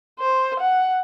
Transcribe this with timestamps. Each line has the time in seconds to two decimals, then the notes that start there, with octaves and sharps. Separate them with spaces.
0.20 C5
0.60 F#5